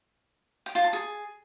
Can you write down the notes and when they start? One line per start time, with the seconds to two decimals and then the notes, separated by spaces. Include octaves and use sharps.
0.66 G5
0.75 F4
0.84 A5
0.93 G#4